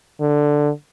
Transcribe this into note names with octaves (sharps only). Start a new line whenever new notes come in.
D3